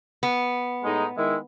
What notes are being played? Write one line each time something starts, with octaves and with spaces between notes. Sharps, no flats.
B3
A2 G#3 D#4
D#3 G#3 E4